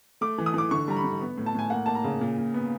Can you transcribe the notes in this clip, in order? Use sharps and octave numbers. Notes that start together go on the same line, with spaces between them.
A3 D6
E3
D#6
E3 D6
D3 C#6
G3 A#5
B5
D3
B3
A2
A5
A2 G#5
A#3 F#5
A#3 A5
A#5
C#3
A#2
A#2
B3